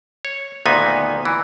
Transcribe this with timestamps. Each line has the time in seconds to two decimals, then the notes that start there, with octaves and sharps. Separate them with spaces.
0.25 C#5
0.66 D2 A#2 D#3 B3 D#4 G#5
1.25 E3